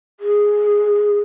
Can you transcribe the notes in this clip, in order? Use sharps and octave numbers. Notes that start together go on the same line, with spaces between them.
G#4